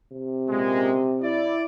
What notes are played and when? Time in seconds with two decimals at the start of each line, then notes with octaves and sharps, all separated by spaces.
0.12 C3
0.49 A#2 C#3 G#3
1.22 E4 D5